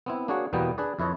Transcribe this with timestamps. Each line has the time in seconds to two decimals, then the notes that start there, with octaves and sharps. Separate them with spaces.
0.06 B3 C4 E4
0.28 A#3 D4 F#4 G#4 C#5 F#5
0.53 E2 B2 G3 A#3 B3 G5
0.78 D4 G#4 B4 D5
0.99 F2 E4 B4 C#5 D#5 A5